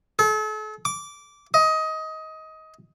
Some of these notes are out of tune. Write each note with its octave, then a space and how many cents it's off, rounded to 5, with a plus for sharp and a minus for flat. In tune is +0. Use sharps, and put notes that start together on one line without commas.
A4 -40
D6 -15
D#5 +20